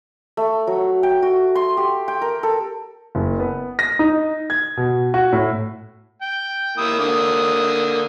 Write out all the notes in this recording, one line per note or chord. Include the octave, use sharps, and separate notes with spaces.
A3
F#3
G5
F#4
C6
G4
G5
A#4
A4
F#1
B3
A#6
D#4
G#6
B2
F#4
A2
G5
A#3 E4 D#6
D3 A#3 D#6